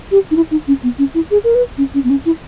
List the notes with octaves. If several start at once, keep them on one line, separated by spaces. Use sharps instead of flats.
G4
D#4
E4
D#4
C#4
B3
C#4
E4
G#4
A#4
B4
C#4
C#4
B3
C#4
E4